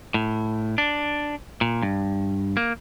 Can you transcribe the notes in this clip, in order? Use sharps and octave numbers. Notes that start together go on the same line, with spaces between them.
A2
D4
A#2
G2
A#3